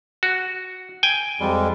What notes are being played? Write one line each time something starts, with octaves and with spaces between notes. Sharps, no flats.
F#4
G5 G#5
F2 G3 G#3